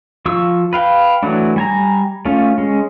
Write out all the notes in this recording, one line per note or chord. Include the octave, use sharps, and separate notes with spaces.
F3 F4 C#6 E6
B4 F5 G5
E3 F#3 A3 D4
G3 G#5 A#5
A3 C#4 F4
G#3 C#4